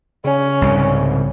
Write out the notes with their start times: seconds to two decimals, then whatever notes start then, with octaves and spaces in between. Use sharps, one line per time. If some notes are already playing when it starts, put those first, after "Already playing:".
0.24 C#3 C#4
0.62 C2 G#2